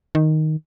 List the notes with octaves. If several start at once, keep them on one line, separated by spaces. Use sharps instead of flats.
D#3